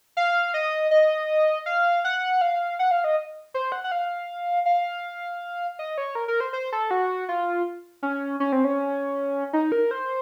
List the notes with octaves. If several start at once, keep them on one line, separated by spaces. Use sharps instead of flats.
F5
D#5
D#5
F5
F#5
F5
F#5
F5
D#5
C5
F#5
F#5
F5
F5
D#5
C#5
A#4
A#4
C5
C5
A4
F#4
F4
C#4
C#4
C4
C#4
D#4
A#4
C5